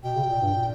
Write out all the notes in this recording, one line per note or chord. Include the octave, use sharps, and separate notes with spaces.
B2 G5
C#3
B2
A#2
G2
A#2